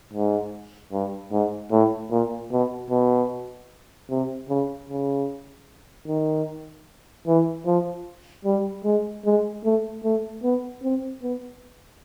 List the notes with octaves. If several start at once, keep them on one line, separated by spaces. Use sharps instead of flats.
G#2
G2
G#2
A2
A#2
B2
B2
C3
C#3
C#3
D#3
E3
F3
G3
G#3
G#3
A3
A3
B3
C4
B3